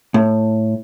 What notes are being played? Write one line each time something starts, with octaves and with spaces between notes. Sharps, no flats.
A2